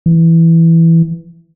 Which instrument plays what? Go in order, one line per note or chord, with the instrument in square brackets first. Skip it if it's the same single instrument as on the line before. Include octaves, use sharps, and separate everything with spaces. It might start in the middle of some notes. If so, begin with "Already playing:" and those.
[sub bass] E3